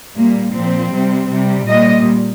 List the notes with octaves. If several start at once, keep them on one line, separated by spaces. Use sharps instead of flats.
A#2 G3 A#3
A#2 F3 C4
C3 G3
C3 G3
A#2 G3 D#5